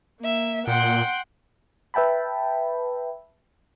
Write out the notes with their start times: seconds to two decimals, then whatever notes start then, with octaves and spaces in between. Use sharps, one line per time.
0.21 A#3 E5
0.67 A#2 F#5 G5 C6
1.94 B4 E5 G5 A5 B5